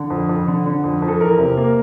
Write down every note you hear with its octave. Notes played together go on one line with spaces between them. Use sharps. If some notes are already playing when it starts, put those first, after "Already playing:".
Already playing: D3
F2
F2
D3
D3
F2
F2
A4
E2 A#4
C3
A#3